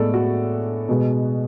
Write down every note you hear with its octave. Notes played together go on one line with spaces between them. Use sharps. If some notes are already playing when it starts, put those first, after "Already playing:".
Already playing: A2 G#3 B3 A4 D5
F#4
B2 G#3 B3